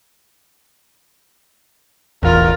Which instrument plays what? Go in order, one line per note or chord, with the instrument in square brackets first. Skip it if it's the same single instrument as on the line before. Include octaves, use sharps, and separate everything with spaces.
[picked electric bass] E1 A1 E2 [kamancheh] F4 A#4